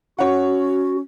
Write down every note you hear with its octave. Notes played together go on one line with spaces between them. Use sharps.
C#4 F#4 C#5 F#5